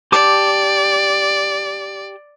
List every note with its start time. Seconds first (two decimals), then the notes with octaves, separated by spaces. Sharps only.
0.12 G4 D5 A5 D6